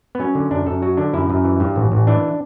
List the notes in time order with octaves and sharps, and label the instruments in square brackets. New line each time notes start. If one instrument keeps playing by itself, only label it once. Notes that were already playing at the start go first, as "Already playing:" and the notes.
[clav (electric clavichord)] B3
F#3 C#4
D3
F#2 D4
F#2 A4
F#3 F#4
D3 D4
F#2 E4
F#2
E3
G2
A1
A1
E3 D4